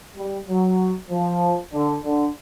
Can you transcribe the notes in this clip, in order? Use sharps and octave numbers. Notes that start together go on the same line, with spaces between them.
G3
F#3
F3
D3
D3